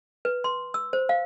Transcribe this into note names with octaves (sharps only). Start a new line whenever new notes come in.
B4
C6
E6
C5
F5